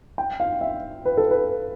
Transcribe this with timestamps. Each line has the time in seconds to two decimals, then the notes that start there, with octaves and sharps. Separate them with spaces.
0.18 G5
0.40 F5
0.61 E5
1.06 B4
1.17 A4
1.31 B4